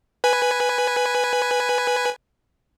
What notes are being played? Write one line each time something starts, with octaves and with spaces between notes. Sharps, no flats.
B4 G#5